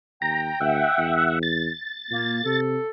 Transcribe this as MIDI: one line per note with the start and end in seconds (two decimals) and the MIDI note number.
0.22 0.51 39
0.22 1.38 79
0.22 0.59 82
0.61 0.85 38
0.61 1.39 76
0.61 1.39 78
0.98 1.69 40
1.43 2.60 93
2.11 2.42 46
2.11 2.39 58
2.45 2.77 48
2.45 2.90 69